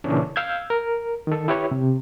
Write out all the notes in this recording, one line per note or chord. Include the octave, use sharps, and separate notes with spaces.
A#2 C#3 E3 C#4 D4
F5 E6 G6 G#6
A#4
D#3 A4
E4 G4 B4 C#5
C3